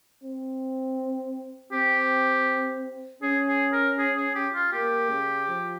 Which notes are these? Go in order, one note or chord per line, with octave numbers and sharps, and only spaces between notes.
C4
C4 G4
C#4 G#4
G#4
A#4
G#4
G#4
G4
F4
A#3 G4
C#3
F3